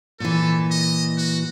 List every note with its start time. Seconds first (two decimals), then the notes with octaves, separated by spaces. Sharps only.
0.20 A#2 E3 A4
0.71 D#5
1.18 F#4